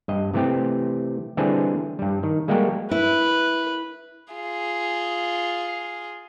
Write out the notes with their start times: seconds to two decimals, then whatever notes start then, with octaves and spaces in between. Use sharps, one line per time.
0.08 G2 D#5
0.34 C3 E3 A3 C4 G4
1.37 D3 E3 G3 C4 D4 G#4
1.99 G2 G3
2.23 D#3
2.48 G3 G#3 A#3 F#4 G4 A4
2.91 E4 B4
4.33 F4 G#4